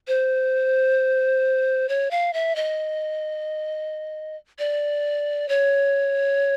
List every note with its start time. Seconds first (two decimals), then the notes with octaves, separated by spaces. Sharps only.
0.08 C5
1.89 C#5
2.11 F5
2.34 E5
2.56 D#5
4.59 D5
5.49 C#5